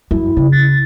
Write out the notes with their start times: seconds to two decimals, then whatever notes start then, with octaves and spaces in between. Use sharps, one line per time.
0.11 F#2 E4
0.37 C#3
0.52 A6